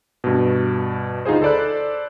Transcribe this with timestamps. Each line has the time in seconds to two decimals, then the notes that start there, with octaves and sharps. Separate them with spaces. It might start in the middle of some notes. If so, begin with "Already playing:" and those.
0.24 G2 B2
1.25 D2 D#4 F4 G#4 C5
1.42 A4 C5 D5 B5 F#6